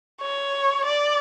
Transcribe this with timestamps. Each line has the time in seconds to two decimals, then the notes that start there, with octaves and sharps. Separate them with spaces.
0.21 C#5
0.85 D5